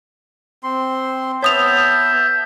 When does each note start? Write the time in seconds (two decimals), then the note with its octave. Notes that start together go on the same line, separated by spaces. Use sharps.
0.63 C4 C6
1.43 B3 C#5 E5 A5 D#6 G6 F7